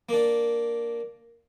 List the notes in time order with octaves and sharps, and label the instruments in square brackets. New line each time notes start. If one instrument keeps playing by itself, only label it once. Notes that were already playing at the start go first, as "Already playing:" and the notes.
[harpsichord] A#3 D4